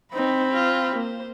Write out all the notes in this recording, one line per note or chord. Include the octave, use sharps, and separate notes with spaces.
C4 D#4 B5
F4
A#3 C5